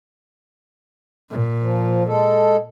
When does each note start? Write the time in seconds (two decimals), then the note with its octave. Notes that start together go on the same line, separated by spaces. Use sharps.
1.30 A#2
1.61 F3
2.07 G#3 A4